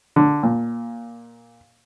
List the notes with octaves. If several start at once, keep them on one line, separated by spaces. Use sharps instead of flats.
D3
A#2